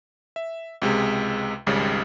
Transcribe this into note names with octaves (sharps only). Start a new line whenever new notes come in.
E5
C#2 C3 G#3
G#1 C#2 C#3 G3